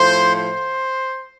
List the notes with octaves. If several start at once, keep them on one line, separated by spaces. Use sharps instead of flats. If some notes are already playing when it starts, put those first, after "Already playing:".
Already playing: A2 F3 C5
C5